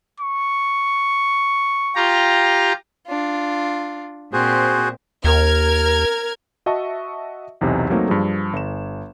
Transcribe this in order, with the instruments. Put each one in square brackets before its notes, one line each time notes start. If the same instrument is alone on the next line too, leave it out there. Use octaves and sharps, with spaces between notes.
[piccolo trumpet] C#6
[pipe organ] F4 G4 A#5
[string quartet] D4 F4
[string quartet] A#2 C4 [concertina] F#4 G#4 C5
[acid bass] D#2 [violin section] A#4 F6 G#6
[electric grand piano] F#4 D#5 E5 A5 C#6
B1 E2 C3 D#4
F#3 A3 A#3 C4 D#4
G2 F3 G#4
G1 E7